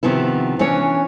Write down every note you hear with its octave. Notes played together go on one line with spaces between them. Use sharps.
C3 D#3 F3 B3 E4
E3 C#4 D4 C#5